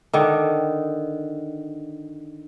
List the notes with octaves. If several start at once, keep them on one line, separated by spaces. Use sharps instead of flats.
D3 D#3